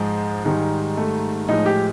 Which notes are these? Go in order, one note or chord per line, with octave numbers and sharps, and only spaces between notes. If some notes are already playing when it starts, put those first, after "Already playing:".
Already playing: G#2 F3 G#3
G#2 D#3 G3 G#3
A3
A2 F3 G#3 D#4
G4